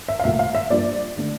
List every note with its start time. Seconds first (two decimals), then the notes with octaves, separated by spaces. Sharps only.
0.08 E5
0.19 F5
0.24 C2 A#2 A3 E5
0.39 F5
0.55 E5
0.70 G2 F3 A#3 D5
1.17 D3 A3 D4